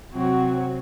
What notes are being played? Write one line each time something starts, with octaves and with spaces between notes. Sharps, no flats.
C3 F#3 C4 F#4